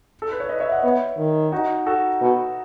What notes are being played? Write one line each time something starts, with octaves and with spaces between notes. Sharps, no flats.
A4
B4
C#5
B4 D#5
C#5 E5
D#5 F#5
B3 C#5 E5
D#3
D#4 F#4
F#4 A4
B2